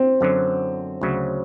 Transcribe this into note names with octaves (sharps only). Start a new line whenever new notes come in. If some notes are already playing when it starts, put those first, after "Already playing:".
Already playing: C4
F#2 D3 F#3
D2 C#3 F#3